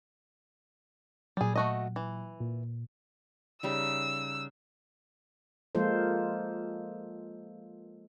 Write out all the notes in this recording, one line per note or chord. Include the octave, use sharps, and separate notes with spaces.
A#2 F#3 G3 G#4
A3 F#4 D#5
E3
A#2
C#3 G3 D#4 E6
F3 G#3 A#3 F4 A4 C5